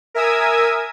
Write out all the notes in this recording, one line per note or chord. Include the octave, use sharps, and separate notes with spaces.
A#4 E5 G#5 D#6 E6 G#6